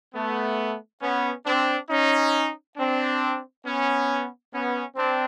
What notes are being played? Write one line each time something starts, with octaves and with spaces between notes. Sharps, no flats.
A3 B3
B3 C#4
C4 D4
C#4 D#4
C4 D4
B3 C#4
B3 C#4
C4 D4